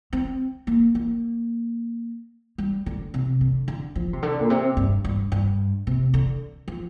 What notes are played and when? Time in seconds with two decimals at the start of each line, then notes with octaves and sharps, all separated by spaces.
0.13 C4
0.67 A#3
0.95 A#3
2.58 G3
2.86 D3
3.14 C3
3.41 D3
3.68 D3
3.96 F3
4.13 C3
4.23 D3
4.40 A#2
4.50 C3
4.77 G2
5.05 G2
5.32 G2
5.87 C3
6.14 D3
6.68 F3